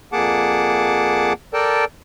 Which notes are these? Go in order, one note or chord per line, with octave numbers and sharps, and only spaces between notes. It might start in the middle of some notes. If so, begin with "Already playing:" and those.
F2 A#3 G#4 F#5 A5 D6
A4 A#4 D5 G5 A5